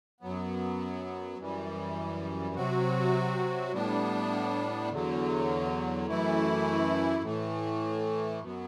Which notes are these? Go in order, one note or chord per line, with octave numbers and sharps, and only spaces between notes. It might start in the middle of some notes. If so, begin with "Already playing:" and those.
F#2 F#3 B3
F#2 E3 G3
C3 F#3 C4 F#4
A2 G3 B3 D4
E2 D3 F#3
F#2 E3 A3 E4
A2 E3 A3
F#2 F#3 B3